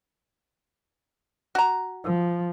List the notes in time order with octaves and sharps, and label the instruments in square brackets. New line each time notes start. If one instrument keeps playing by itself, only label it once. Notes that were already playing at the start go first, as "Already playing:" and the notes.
[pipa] F#4 A#5
[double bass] F3